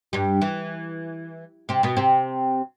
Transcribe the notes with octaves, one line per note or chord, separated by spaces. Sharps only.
G2 G3
E3
C3 C4
B2 B3
C3 C4